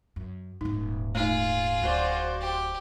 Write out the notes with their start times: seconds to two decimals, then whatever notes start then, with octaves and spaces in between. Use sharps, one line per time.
0.16 F#2
0.61 D#1 G#2 D#4
1.15 A3 D#4 F4 G#4
1.82 D1 F#4 C5 D5
2.40 G4